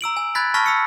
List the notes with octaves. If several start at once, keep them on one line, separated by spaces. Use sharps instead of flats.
A#5 E6 D7 F#7
G#5
B5 F#6 G#6 A6 B6
A5 B5 C#6 F6 A#6 B6
B5 E6 C#7